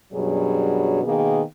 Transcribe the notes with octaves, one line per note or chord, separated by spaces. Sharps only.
F#2 B2 F#3 G3 D4 G#4
B2 D#3 A#3 B3 G#4